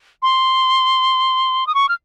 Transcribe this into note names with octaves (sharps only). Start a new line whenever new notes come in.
C6
D#6
C#6
F6